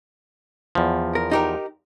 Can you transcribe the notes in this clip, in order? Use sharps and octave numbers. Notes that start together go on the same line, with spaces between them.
E2 F3
A#4
D#4 G4 A#4